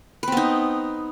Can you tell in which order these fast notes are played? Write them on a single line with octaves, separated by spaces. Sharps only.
B4 C4 B3 D#4